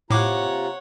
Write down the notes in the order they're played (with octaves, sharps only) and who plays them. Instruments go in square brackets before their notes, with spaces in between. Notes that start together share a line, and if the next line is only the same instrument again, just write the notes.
[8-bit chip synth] A2 D6 [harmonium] C3 F4 A#5 [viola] C#5 F#5